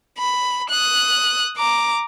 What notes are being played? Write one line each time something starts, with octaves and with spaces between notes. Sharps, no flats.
B5
D#6 F#6
A#5 D6